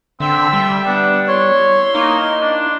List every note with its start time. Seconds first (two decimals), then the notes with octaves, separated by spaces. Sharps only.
0.20 D3 C4 E5 G5
0.53 G3
0.86 B3 D4 F#5
1.28 E4 C#5 C6
1.95 A#3 D#4
2.41 D4